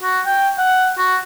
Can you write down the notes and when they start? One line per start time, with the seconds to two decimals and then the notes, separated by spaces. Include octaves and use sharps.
0.03 F#4
0.26 G5
0.58 F#5
0.98 F#4